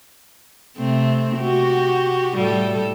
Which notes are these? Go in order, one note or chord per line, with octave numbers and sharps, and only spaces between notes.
C3 A3 C4
F#4 G4
A2 G3 A4